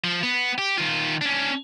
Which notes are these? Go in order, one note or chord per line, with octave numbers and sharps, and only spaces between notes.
F3
B3
G4
D#3 F4
C#4 D4